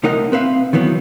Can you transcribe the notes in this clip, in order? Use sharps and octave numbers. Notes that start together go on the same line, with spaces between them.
C2 A3 D#4 A#4 D#5 F#5
C4 B4 E5 F5
D#3 E3 F#3 B3